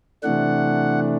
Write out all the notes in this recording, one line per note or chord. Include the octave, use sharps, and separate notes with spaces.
C3 E3 A3 D4 F#5